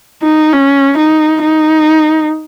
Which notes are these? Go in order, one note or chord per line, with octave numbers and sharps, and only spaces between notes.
D#4
C#4
D#4
D#4